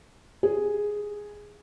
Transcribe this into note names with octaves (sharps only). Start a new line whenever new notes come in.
G#4